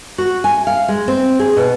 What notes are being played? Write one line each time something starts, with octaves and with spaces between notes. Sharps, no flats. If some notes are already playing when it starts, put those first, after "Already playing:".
F#4
G#5
F5
G#3
C4
G#4
B2